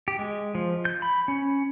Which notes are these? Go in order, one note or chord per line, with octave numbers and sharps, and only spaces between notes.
G4
G#3
F3
G6
B5
C#4